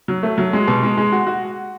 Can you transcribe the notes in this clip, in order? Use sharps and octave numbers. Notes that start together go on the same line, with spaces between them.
F#3
A3
F#3
G#3
B2
G#3
G#3
F#4
F#4